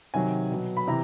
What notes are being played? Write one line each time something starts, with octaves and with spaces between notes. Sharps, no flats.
C3 D#3 F#3 G#5
B2 F#3
B5
C3 E3 A#5